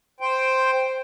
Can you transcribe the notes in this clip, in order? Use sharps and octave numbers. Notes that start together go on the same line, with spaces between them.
C5 G5